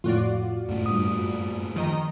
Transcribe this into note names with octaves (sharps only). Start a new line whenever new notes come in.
F2 A2 F4 F#4 D5
F#2 A2 A3
G2 D#6
D#3 F3 D#5 A#5